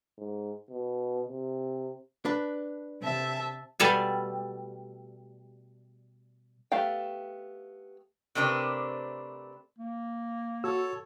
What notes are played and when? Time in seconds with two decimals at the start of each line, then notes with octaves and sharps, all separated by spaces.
0.18 G#2
0.70 B2
1.29 C3
2.25 D4 B4
3.01 C3 E5 A5
3.80 B2 G3 A3 A4 D5 G#5
6.72 A3 B3 G4 F5 G5
8.35 C3 A3 C4 D4 A#4 B4
9.79 A#3
10.64 F#4 A4 C#5 E6